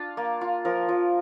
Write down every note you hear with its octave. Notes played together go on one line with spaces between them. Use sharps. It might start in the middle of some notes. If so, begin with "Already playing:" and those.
Already playing: D4 F4
A#3
F4
F3 A#4
F3